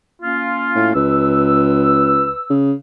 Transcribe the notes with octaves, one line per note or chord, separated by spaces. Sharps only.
A#3 C#4 F4
A2
C#2 B4 E6
C#3